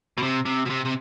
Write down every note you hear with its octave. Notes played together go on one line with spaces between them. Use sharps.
B2
C3
C3
B2
C3
C3